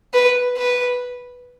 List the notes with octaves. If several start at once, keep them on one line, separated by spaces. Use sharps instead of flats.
B4
B4